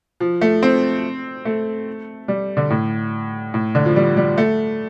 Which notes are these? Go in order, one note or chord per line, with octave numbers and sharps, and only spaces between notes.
F3
A3
C4
A3
G3
D3
A2
A2
D3
F3
G3
G3
A3